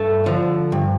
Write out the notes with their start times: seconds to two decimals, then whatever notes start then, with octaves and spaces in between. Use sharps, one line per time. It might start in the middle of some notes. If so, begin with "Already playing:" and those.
Already playing: G2 A3 A4
0.26 D3 F3
0.72 G2